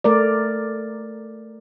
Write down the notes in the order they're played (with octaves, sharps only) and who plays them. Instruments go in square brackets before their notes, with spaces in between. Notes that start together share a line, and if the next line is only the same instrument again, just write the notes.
[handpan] A3 A#4 D5